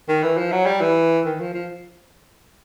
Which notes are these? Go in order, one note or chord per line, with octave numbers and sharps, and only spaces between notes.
D#3
E3
F3
F#3
G3
E3
D#3
F3
F3